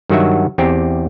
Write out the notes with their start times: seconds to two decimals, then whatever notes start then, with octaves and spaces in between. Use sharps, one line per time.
0.10 G2 D#3 F#3 F#4 E5
0.58 E2 C4 G4